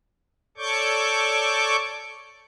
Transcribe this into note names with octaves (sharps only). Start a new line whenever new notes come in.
A4 C#5 D5 C#6 D6 G6